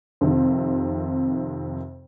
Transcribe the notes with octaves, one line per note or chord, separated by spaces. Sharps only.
F2 C3 D#3